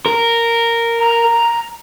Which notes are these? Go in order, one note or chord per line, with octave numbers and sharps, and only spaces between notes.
A#4
A#5